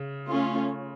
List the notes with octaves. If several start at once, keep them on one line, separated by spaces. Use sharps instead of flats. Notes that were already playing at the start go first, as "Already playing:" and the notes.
Already playing: C#3
A3 C#4 F4